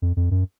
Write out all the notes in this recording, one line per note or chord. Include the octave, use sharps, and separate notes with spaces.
F2
F2
F#2